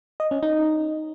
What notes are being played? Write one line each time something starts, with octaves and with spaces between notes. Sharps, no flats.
D#5
C#4
D#4